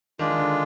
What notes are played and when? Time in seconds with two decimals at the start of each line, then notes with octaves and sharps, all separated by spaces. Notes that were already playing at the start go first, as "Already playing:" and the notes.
0.19 D#3 G#3 D4 F4
0.30 D#3
0.38 D3